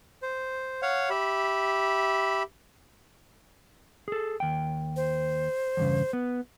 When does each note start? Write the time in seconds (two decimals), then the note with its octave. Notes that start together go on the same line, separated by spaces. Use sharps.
0.22 C5
0.82 C#5 F5 F#5
1.10 G4 E5 B5
4.08 G#4 A4
4.40 D#2 G5
4.96 C5
5.77 E2 G2 C#3
6.13 B3